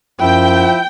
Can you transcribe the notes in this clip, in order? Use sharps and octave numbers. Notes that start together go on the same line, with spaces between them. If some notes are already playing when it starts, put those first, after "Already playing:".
F#2 F3 E4 G5